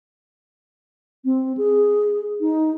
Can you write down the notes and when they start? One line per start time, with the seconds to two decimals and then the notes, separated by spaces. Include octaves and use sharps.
1.25 C4
1.57 G#4
2.40 D#4